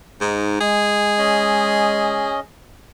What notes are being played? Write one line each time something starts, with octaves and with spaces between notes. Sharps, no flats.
G#2 D#4
G#3 G#4
C#4 D#5